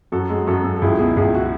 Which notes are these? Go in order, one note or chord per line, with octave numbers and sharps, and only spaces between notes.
F#2 F#4 A4
G#3
F#2 F#4 A4
F#2
A4
C#2 E4 G#4
B2 E4 G#4
C#2 E4 G#4
F#4